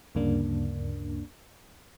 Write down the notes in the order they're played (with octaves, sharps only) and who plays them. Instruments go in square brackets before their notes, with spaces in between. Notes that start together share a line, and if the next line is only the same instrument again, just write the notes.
[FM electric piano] D2 G2 C#3 A#3 D4